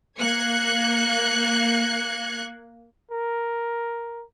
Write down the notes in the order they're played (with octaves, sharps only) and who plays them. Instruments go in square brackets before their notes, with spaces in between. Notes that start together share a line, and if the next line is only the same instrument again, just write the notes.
[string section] A#3 F#6 G#6 C#7
[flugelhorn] A#4